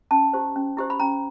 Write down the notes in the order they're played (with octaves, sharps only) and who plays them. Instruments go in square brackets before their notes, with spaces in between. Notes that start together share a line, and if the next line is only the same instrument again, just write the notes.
[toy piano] C#4 A5
E4 G4 C5
C#4
E4 G4 C5
B5
C#4 A#5